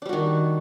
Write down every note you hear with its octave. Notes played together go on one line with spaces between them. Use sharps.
D#3 G3 D4 F#4